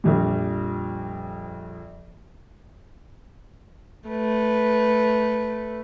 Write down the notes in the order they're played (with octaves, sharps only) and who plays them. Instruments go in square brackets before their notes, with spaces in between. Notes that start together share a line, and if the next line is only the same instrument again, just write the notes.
[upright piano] A#1 F2 G3
[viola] A3 B4